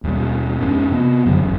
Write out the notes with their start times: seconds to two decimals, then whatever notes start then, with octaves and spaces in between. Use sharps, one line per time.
0.04 D#2 B2 G3
0.61 F2 G#2 C#4
0.91 C3 B3
1.26 F#2 D3 F#3 G3
1.42 G1 E2